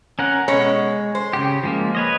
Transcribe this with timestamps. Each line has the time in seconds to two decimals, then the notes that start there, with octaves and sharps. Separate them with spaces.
0.19 C#4 A#4 F#5
0.48 B2 G#3 C#4 C#5
1.15 C5
1.33 C#3 G4
1.63 F3 G#3 A#3
1.95 B4 C#5 D#5